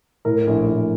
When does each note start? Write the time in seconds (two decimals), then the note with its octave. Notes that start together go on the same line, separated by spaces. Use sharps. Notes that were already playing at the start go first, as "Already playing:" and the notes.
0.25 A2 A#4
0.47 A#1
0.69 A#1